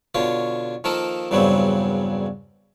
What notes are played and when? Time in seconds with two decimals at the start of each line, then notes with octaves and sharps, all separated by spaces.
0.15 B2 D3 F4 C#5
0.84 D#3 F3 A#3 A4 A#4
1.31 E2 G2 C#3 F#3 G3 C4